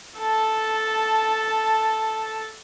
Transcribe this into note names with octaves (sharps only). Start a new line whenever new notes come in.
A4 A5